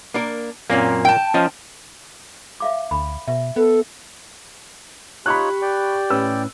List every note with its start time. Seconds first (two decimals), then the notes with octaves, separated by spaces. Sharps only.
0.14 A#3 D4 A#4
0.70 F#2 A#2 A#3 C4 C#4
1.05 G5 A5
1.34 F3 C#4 D#5
2.60 E5 F5 D6
2.91 D2 B5
3.28 B2 E5
3.56 B3 A4
5.26 D#4 F4 G4 C#5 B5 C#6 F#6
5.62 D5 G5
6.10 A2 C#4 B4 E6